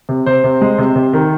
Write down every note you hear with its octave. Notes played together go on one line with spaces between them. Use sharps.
C3
C3 C5
C3
G#3
C3
C3
D#3